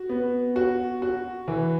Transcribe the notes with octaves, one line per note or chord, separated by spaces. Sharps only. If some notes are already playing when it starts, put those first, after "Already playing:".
Already playing: F#4
B3
F#4
F#4
E3